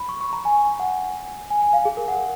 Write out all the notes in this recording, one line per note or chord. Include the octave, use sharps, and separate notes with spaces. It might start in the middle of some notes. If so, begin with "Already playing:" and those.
Already playing: B5
C#6
C#6
A#5
G#5
F#5
G#5
G#5
F5
G#4
A#4
F#5